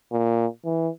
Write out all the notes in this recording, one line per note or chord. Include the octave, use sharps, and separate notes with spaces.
A#2
E3